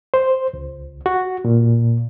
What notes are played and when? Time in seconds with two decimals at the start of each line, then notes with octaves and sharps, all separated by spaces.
0.14 C5
0.53 C#2
1.06 F#4
1.45 A#2